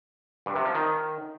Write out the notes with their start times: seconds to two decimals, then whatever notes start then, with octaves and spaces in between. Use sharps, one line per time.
0.46 G2
0.56 C3
0.65 F3
0.75 D#3